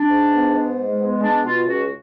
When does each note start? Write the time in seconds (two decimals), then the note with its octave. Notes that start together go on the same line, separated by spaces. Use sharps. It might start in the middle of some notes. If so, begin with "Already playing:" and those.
Already playing: D4
0.09 G#2
0.32 B3
0.54 G#2
0.77 G#3
0.98 B3
1.21 G#3 D4
1.43 B2 F4
1.65 C#2 F#4